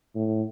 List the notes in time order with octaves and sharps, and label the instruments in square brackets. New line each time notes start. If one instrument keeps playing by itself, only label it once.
[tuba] A2